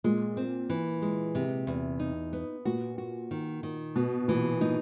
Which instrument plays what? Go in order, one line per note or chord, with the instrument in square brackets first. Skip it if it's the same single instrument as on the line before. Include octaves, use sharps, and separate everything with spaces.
[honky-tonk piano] A#2 [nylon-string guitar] G#3
[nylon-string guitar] C4
E3
G#3
C3
E2
D#4
B3
[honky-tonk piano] A#2 [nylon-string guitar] F#4
[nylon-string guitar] F#4
D#3
D#3
[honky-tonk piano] B2 [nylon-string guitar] B3
[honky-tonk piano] A#2 [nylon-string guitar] E3
[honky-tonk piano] A#2 [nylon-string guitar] D#4